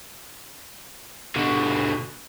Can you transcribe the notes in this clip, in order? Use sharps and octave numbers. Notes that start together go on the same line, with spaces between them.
B2 D3